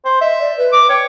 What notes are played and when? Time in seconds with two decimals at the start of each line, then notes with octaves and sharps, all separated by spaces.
0.05 C5
0.21 D#5 E5
0.40 D5
0.58 B4
0.72 D6
0.89 C#5 G5